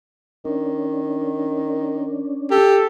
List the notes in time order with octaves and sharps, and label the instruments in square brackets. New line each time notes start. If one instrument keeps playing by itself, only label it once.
[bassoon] D#3 [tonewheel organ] C#4 D4
[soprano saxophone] G4 [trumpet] A4